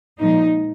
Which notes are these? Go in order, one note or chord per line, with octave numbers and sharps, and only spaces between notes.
A#2 F3 G#3 D#4